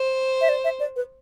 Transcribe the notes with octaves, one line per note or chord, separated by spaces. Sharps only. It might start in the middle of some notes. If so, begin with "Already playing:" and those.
Already playing: C5
E5
D5
E5
D5
B4